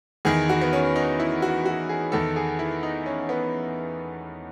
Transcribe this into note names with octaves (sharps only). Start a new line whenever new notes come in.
E2 D#3 G#4
F#4
B3
C#4
D#4
E4
F#4
F#4
G#4
E2 D#3 A4
G#4
E4
D#4
C#4
B3